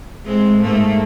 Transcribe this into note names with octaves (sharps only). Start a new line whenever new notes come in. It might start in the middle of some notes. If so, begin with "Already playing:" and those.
A2 G#3 C4
G#2 A3 A#3